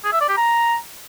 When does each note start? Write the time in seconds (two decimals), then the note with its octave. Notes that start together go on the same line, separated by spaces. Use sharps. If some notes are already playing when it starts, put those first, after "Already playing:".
0.05 G#4
0.13 E5
0.21 D5
0.29 G4
0.37 A#5